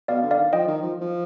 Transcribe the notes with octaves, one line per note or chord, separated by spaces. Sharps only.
B2 D5 F5
D3
D5 F5
D#3
F3 D#5 G5
D#3
F3
F3